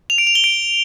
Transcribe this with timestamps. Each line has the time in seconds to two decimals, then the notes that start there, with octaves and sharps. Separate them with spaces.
0.10 F7
0.18 D7
0.27 F7
0.35 G7
0.44 D7